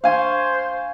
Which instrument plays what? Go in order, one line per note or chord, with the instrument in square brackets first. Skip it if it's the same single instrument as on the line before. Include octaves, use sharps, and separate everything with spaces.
[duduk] C5 [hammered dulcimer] F5 G#5 C#6